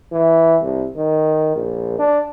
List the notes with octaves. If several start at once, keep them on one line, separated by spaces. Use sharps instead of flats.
E3
C2
D#3
A#1
D4